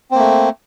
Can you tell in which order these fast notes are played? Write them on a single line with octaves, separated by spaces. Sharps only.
C4 A#3 A3